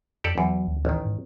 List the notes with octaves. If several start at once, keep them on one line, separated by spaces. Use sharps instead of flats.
F2 G4 A4 D5
E2 F#3
D2
A1 D#3
G#2